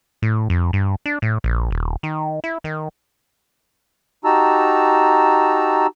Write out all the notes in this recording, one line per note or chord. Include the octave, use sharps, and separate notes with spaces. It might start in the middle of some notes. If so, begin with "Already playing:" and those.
A2
F2
G2
D4
A2
A#1
D#1
D#3
E4
D#3
D#4 F#4 G4 A5 A#5 E6